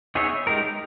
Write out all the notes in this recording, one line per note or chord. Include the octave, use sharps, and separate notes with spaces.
B3 D#4 G#4 C#5 E5
G#3 D#4 G4 A#4